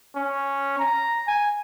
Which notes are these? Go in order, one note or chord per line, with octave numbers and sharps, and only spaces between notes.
C#4
A#5
G#5